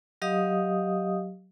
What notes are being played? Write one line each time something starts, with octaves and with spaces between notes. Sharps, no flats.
F#3 G4 D#5 F5 D#6